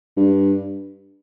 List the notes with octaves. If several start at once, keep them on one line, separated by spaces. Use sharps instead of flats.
G2